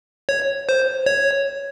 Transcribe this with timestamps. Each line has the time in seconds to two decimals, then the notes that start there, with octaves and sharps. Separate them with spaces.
0.29 C#5
0.69 C5
1.06 C#5